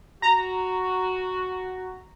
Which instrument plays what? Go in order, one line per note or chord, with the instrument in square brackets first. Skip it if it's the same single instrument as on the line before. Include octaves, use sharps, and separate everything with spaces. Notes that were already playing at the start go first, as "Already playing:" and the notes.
[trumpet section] F#4 [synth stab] A#5